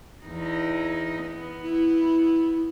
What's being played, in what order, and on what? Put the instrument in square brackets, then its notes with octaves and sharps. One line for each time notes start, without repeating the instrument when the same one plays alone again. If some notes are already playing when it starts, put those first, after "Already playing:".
[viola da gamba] E2 D#4
B3
[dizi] E4